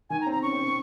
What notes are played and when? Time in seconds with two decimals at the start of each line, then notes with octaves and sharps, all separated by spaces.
0.10 D#3 G#5
0.21 A#5
0.26 C4
0.32 A#5
0.42 C#4 C#6
0.53 C4
0.64 C4